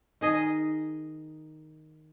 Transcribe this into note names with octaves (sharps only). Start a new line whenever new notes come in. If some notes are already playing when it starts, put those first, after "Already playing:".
D#3 G#4 D#5